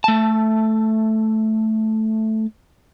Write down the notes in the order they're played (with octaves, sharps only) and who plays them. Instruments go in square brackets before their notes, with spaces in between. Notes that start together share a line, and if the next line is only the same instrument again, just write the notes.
[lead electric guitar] A3 A5